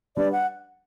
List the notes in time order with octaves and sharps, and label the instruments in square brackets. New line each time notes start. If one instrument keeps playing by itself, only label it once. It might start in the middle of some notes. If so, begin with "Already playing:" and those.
[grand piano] G3 D4 G4 B4 [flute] D5
[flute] F#5